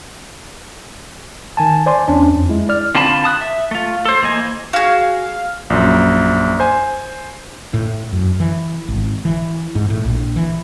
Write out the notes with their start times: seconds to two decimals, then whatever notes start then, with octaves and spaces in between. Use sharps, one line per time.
1.57 D#3 G#5 A5
1.86 C5 D5 G#5 C6
2.08 E2 C#4 D4
2.35 F2
2.49 G#3 E4
2.69 D5 F6
2.95 D3 C4 F4 A5 B5
3.24 A5 D#6 F#6
3.41 E5
3.71 A3 F4
4.05 A4 C5
4.22 E3 A#3 D#5 G#5
4.73 F#4 G#4 F5
5.70 A#1 F#2
6.60 C5 G#5
7.74 A2
8.13 F#2
8.40 E3
8.88 G#1
9.25 E3
9.75 G#2
9.90 A2
10.05 A#1
10.36 E3